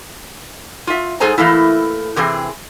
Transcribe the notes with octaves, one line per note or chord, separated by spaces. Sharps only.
F4 E5
G#2 G#4 A4 C5 G#5 A#5
E3 A3 A#3 E4
C3 E3 C4 G#4